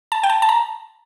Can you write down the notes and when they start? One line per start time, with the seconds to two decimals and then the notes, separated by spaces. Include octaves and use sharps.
0.12 A5
0.23 G5
0.30 A5
0.42 A5
0.49 A#5